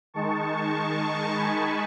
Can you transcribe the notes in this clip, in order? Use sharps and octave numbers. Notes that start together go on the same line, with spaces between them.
D#3 G#3 D#4 A5 C#6
G#5 B5